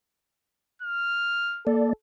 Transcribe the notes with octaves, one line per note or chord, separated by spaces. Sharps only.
F6
A#3 A4 D5